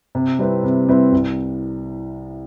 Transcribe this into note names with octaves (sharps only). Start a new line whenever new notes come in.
C3
G3 C4 E4 B4
C3
G3 C4 E4 B4
C2